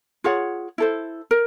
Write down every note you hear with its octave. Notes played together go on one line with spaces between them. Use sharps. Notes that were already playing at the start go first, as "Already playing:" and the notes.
F4 G#4 C#5 F#5
E4 A4 C5
A#4